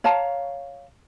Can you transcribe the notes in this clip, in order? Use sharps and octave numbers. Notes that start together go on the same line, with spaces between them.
C#5 F5 A5 A#5